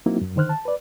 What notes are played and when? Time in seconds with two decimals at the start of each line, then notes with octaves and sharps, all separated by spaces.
0.06 F#3 A#3 C4 D#4 E4 F#4
0.21 F#2
0.36 D3 D#3 C5 F6 F#6
0.49 A5
0.65 B4 D5